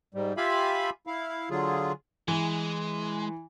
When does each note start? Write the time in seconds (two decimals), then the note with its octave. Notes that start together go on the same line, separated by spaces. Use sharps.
0.14 G#2 G3
0.37 F4 G4 E5 F5 G#5 B5
1.07 E4 F5
1.50 D3 F#3 F4 G#4
2.28 E3 G#3